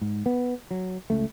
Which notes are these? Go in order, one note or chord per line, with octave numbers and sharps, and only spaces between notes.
G#2
B3
F#3
C#2 A3